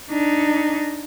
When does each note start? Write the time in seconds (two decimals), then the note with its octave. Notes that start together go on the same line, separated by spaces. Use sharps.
0.11 D4 D#4